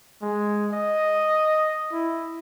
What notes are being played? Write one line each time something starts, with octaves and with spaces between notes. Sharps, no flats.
G#3
D#5
E4